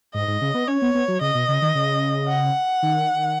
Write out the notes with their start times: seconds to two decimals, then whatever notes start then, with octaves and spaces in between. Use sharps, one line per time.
0.14 G#2 D#5
0.28 G#2
0.42 C#3
0.54 B3
0.68 C#4 C#5
0.82 B3
0.95 B3
1.08 F#3
1.21 C#3 D#5
1.35 B2
1.49 C#3
1.62 D#3
1.75 C#3
2.29 F#5
2.83 D#3